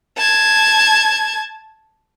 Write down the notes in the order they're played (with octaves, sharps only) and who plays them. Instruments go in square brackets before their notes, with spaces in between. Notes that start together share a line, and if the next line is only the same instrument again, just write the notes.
[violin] A5 G#6